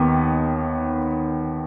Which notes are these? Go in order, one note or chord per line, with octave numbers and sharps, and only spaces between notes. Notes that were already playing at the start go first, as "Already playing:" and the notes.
Already playing: D#2 D#3 B3